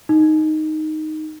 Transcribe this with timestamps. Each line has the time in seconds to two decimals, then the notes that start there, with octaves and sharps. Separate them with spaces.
0.09 D#4